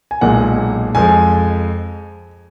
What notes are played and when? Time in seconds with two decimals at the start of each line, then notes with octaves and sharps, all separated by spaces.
0.11 G#5
0.21 B1 A#2 G#3 F#5
0.95 F2 F3 G#3 G#5